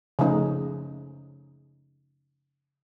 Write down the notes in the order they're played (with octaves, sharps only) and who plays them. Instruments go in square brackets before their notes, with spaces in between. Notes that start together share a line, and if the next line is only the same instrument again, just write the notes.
[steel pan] C#3 F3 A3 D#4